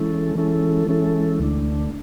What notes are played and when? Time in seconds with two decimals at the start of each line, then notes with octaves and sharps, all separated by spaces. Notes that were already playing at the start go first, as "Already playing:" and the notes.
Already playing: E3 G#3 C#4 E4 A4
0.35 E3 G#3 C#4 E4 A4
0.88 E3 G#3 C#4 E4 A4
1.39 D2 D3 A3 D4